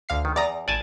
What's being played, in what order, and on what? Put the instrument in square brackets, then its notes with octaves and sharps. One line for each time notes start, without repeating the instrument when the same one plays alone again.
[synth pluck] D2 F5 C7
[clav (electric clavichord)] D#3
[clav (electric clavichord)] E2 [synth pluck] D5 A#5 D#6
[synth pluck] A1 [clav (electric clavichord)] D5 G#5 A5